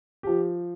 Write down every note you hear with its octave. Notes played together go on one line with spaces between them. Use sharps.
F3 G4